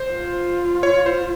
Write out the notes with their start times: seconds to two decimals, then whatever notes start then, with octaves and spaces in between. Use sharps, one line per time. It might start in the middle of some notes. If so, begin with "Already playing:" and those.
Already playing: C5
0.13 F4
0.83 C#5
1.06 C5